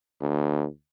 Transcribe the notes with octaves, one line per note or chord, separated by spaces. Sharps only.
D2